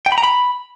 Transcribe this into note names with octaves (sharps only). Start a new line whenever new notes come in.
G5
B5
A#5
B5